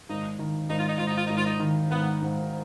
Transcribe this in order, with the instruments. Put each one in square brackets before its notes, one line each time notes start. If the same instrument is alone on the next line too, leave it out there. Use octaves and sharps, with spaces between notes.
[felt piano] G#1 [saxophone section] D#4
[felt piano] D#3
[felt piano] G#1 [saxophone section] D#4
[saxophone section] F4
D#4
[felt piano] G#2 [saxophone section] F4
[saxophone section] D#4
F4
[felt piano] G#1 [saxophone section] D#4
[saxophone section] F4
D#4
[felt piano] D#3
[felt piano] G#1 [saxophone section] B3
[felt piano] G#2